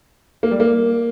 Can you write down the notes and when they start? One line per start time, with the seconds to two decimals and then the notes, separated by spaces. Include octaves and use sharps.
0.43 A#3
0.51 G3
0.60 A#3